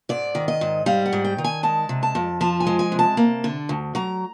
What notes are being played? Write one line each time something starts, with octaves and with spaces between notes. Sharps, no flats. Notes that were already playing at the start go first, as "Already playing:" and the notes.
G#2 D5
D#3
D#5
G#2
G3 F5
F#5
G#2
G5
D#3
G#5
G#3 A5
C3
A5
F2
F3 A5
G#5
G#3
G#5
C3
A5
A#3
D3
D2
F#3 A#5